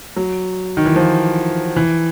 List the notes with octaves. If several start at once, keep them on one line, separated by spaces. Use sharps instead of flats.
F#3
D#3
E3
F3
E3